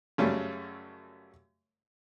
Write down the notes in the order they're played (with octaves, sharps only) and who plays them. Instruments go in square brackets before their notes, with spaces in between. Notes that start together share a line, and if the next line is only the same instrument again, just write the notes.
[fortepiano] F#2 C#3 G3 A3